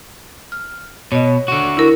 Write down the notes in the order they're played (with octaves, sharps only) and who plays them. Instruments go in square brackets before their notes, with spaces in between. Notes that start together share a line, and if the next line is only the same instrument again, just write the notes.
[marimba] F6
[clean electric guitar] B2 [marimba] C#5 D#5
[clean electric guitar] D3 F#4
[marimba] E4 A#4